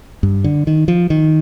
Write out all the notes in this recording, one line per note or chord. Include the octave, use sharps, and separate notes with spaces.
G2
D3
D#3
F3
D#3